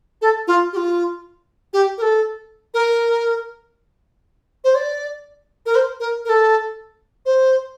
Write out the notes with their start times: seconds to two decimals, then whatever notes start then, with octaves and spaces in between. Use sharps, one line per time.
0.22 A4
0.47 F4
0.73 G4
0.77 F4
1.73 G4
1.98 A#4
2.02 A4
2.74 A#4
4.64 C5
4.75 D5
5.66 A#4
5.75 C5
6.00 A#4
6.25 A#4
6.29 A4
7.26 C5